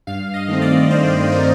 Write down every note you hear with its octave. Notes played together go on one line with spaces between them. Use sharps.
G2 F5
D#5
D#3 A3 C4
D5
G2 C5
D#3 A3 C4 A#4